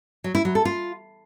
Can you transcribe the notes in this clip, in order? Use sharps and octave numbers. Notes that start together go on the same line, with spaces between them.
F#3
E4
F#3
A4
F4